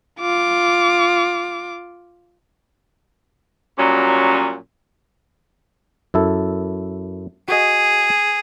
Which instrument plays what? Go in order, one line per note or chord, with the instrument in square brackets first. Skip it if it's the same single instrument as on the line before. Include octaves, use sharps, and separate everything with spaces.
[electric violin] F4 D6
[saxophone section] A#2 F#3 G3 C#4
[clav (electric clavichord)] F#2 E4 A4
[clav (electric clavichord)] F#4 D#5 [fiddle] G#4